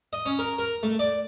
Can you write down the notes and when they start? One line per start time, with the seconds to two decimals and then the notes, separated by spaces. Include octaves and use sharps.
0.13 D#5
0.26 C#4
0.39 A#4
0.59 A#4
0.83 A3
0.99 D5